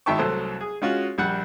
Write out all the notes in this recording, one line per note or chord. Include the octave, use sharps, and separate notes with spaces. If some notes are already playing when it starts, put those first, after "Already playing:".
G#1 D#3 E5 G5 A5 C#6
C2 F#3 A3 A4 C5
G#4
G#3 C#4 F4 F#4
A#1 G3 F#5